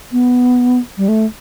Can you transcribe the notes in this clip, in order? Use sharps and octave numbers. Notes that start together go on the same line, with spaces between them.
B3
G3
A3